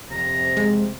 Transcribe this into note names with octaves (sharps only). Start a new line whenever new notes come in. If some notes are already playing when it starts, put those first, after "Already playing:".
F2 C3 A#5
G#3